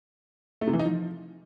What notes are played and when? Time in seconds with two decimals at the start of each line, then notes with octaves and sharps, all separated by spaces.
0.61 A3
0.67 C3
0.73 E3
0.79 D#4
0.85 F3